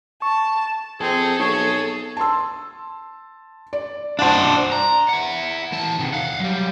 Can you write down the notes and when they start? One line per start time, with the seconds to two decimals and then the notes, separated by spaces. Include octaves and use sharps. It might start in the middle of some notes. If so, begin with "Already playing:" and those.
0.22 A5 C#6
1.01 F2 C4 G#4 A4
1.39 B1 G#4 C#5
2.17 A5 C6 E6
3.73 D5
4.19 D4 C5 F#5 A5
4.72 A#5
5.09 E4 F#5
5.72 E3 A5
5.99 C3 D#3
6.13 F5 F#5
6.40 F#3 G3